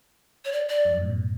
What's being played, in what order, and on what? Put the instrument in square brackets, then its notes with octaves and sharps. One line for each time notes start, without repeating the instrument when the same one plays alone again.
[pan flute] C#5
D5
D5
[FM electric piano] F2
F#2
A2
B2